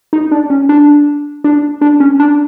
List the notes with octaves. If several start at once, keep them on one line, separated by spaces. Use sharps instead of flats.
D#4
D4
C#4
D4
D4
D4
C#4
D4